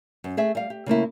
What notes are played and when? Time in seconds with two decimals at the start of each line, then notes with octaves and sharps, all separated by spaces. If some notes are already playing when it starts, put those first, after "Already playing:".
0.24 F#2
0.37 A3 G#4 E5
0.55 G3 F5
0.70 G4
0.86 C#3 A3 A#3 E4